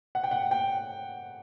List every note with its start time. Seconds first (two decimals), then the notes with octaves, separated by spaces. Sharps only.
0.15 F#5
0.24 G5
0.31 F#5
0.51 G5